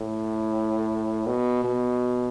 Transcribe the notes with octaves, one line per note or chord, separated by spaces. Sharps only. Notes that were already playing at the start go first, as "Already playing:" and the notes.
Already playing: A2
B2
B2